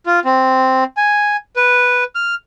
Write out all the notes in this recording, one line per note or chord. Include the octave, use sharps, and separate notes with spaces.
F4
C4
G#5
B4
F6